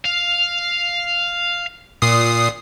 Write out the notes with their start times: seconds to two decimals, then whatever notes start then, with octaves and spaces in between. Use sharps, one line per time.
0.05 F5
2.02 A#2 D#6 C7